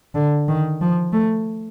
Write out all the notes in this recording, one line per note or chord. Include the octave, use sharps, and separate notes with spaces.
D3
D#3
F3
A3